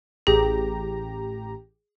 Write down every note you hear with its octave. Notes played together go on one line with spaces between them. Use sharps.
A1 G4 G#4 A#5